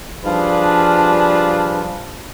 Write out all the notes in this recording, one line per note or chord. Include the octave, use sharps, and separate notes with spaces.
F3 G3 D4 F4 G#4 B4